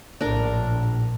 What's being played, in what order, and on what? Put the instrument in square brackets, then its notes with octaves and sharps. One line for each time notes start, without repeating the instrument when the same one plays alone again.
[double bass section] A#1 A2 [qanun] D4 A#4